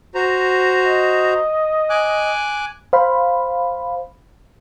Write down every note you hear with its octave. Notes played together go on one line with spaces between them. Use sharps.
F#4 C5 A#5
D#5
G#5 D6 F#6
C5 F5 B5